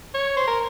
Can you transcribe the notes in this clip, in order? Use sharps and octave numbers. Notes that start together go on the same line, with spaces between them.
C#5
C5
A#4